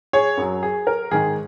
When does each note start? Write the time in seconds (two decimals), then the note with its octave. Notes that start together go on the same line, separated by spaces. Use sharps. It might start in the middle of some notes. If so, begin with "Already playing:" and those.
0.13 G#4 C#5
0.37 F#2 F#3
0.63 G#4
0.87 A#4
1.11 G#2 D#3 G#3 G#4